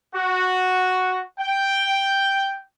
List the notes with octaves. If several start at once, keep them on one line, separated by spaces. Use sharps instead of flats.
F#4
G5